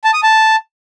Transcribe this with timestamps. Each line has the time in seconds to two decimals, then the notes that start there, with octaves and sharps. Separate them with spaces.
0.04 A5
0.14 D#6
0.23 A5